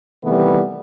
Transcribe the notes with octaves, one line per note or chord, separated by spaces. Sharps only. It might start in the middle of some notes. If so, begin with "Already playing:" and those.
C3 D#3 E3 G3 A3 B3